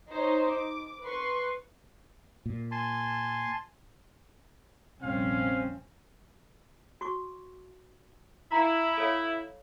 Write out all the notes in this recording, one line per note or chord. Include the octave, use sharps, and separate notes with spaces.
D#4 C5 C#5
D6
B4 C6 C#6
A#2
G#5 A5 C6
F1 A#1 G3 C4 C#4 F5
F#4 C#6 D6
E4 F5 A#5
A4 C#5 F5